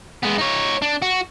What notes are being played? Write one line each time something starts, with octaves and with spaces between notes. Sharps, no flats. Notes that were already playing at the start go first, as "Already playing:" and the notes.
G#3 B3
D#4 C#5
D4
F#4